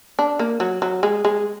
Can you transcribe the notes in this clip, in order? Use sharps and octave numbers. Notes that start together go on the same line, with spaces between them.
D4
A#3
F#3
F#3
G#3
G#3